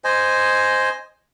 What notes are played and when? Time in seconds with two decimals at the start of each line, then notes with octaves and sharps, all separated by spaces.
0.04 C5 D#5 G#5